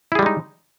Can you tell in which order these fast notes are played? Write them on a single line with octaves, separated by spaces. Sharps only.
E4 G#4 G3 G#3 D#4